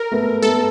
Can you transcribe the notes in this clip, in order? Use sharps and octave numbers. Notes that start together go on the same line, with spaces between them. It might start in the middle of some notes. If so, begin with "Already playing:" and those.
Already playing: A#4
A3 B3
A3 B3 A4